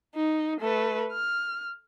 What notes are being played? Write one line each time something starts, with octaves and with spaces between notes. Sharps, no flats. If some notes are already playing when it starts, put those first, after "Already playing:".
D#4
A3 B4
F6